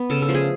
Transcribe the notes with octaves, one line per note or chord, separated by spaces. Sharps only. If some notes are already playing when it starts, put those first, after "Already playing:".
Already playing: B3
C#3 A4
A4
F3 A3
G#4